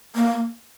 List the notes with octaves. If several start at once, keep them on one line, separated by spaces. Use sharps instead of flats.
A#3